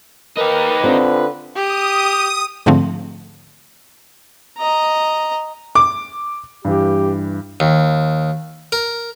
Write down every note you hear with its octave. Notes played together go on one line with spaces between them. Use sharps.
D#4 G4 A#4 B4
D3 C4 F4
G4 D#6
G#2 D3 F3 A3 C4
D#5 A#5
D6
G2 E3 G4
D#2
A#4